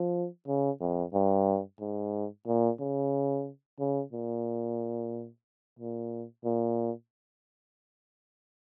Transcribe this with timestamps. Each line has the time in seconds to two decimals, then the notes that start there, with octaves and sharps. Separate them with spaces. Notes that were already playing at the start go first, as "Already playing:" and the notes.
Already playing: F3
0.47 C#3
0.81 F2
1.14 G2
1.80 G#2
2.47 A#2
2.80 C#3
3.79 C#3
4.13 A#2
5.79 A#2
6.45 A#2